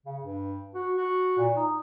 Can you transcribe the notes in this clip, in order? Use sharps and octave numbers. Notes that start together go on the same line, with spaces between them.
C#3
G2
F#4
F#4
A#2
D#4